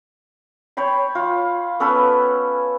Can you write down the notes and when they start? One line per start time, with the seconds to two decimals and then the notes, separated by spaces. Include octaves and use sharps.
0.77 C#5 G5 B5 C6
1.15 F4
1.80 B3 C#4 A4 B4